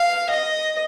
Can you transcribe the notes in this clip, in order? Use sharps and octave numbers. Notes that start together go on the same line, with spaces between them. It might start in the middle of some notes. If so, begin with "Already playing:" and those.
Already playing: F5
D#5